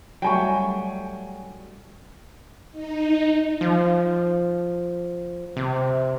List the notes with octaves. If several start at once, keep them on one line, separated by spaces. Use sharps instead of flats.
F#3 G3 A3 G5 G#5 C#6
D#4
F3
C3